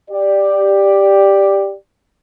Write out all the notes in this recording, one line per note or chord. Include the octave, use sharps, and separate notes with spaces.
G4 D5